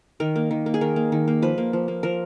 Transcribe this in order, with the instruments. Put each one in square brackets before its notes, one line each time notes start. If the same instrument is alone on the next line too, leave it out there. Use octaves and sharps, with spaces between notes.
[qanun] D#3 A#4
A#3
D#3
A#3
G#4
D#3 A#4
A#3
D#3
A#3
F3 B4
A#3
F3
A#3
F3 A#4